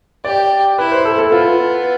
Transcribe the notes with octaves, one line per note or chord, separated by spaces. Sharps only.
G4 D5
E4 B4
C5
A4
A4
B3 F4